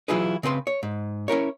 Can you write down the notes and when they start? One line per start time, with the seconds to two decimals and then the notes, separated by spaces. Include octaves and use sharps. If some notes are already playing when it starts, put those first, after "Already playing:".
0.08 E3 F#3 E4 F4 G#4 B4
0.43 C#3 C4 B4 C6
0.67 C#5
0.83 G#2
1.28 C#4 E4 A#4 C#5